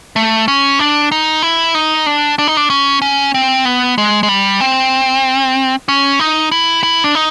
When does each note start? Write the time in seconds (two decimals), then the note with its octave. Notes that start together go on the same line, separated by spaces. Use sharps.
0.16 A3
0.48 C#4
0.79 D4
1.12 D#4
1.43 E4
1.74 D#4
2.06 D4
2.38 D4
2.48 D#4
2.57 D4
2.70 C#4
3.02 C#4
3.34 C4
3.65 B3
3.98 G#3
4.23 G#3
4.29 G3
4.61 C4
5.88 C#4
6.20 D#4
6.52 E4
6.83 E4
7.04 D4
7.15 D#4